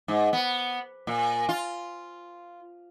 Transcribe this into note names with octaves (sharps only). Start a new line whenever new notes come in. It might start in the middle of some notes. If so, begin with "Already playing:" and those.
G#2
B3
A#2
F4